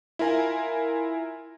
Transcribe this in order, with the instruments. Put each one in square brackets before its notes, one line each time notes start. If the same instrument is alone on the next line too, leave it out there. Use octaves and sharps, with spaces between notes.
[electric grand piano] E4 F4 A#4 G#5